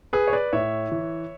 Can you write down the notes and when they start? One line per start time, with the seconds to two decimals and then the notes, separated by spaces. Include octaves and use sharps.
0.13 G#4 B4
0.28 C#5
0.33 B4 D5
0.53 A2 C#5 E5
0.92 E3